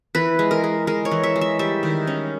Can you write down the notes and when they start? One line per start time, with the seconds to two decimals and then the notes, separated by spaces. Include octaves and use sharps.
0.15 E3 B4
0.39 G#3
0.51 A#4
0.64 G#3
0.87 G#3 A#4
1.05 C#5
1.11 E3
1.23 E5
1.36 G#3
1.41 E5
1.59 G3 E5
1.83 D#3
2.07 C#4